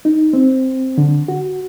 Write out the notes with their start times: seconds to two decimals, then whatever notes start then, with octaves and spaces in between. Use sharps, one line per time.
0.05 D#4
0.33 C4
0.98 D3
1.28 F#4